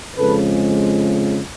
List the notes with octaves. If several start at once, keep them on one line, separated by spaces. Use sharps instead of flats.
F2 C#3 F3 G#3 A4 B4